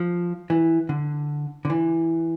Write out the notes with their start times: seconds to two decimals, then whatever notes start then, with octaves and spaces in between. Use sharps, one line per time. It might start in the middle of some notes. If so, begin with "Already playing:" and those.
Already playing: F3
0.50 E3
0.89 D3
1.65 D3
1.70 E3